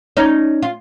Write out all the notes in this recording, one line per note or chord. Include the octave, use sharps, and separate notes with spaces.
C#4 D#4
F4